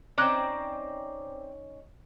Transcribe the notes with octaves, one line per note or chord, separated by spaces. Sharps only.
C4 C#4 D#4 D5 F#6